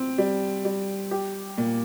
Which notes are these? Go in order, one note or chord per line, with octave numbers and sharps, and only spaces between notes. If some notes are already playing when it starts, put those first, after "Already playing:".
Already playing: C4
G3
G3
G4
A#2